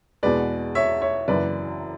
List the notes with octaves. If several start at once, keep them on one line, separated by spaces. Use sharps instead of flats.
E2 B2 G#3 B4 D5
C#5 E5
C#5 E5
F#1 F#2 E3 B4 D5